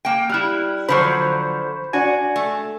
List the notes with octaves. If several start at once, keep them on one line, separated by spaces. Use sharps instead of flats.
A#3 G5
G3 E4 F6 F#6
D3 F3 F#3 C5 B5 C#6
D4 F#4 G#5
A3